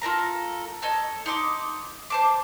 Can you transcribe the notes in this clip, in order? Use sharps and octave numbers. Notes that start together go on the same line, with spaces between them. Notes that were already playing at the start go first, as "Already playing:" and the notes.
F4 A4 A#4 A#5
A4 C#5 D#5
D#4 C6 D6
C5 A5 D6